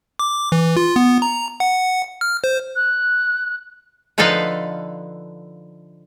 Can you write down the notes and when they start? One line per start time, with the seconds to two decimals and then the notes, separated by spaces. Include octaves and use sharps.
0.19 D6
0.52 E3
0.76 F4
0.96 B3
1.22 A#5
1.60 F#5
2.21 F6
2.44 C5
2.75 F#6
4.18 D3 F3 D#4 A4 B4 F5